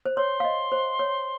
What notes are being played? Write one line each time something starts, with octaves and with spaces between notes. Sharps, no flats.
C5
C#5 C6
F5
D#5
C5
C#5